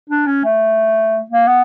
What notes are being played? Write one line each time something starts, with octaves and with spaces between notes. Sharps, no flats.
D4
C#4
A3
A#3
B3